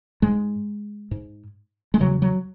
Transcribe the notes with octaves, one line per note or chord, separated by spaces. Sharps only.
G#2 G#3
G#2
G#3
E2 C#3 F#3
F#3